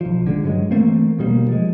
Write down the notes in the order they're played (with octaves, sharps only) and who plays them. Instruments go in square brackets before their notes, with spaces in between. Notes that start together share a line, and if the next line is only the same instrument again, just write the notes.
[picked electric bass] B1 F3
D3 G#3
G2 F#3 G#3
E3 A3 A#3 C4
D2 B2 G3 A#3
F3 G#3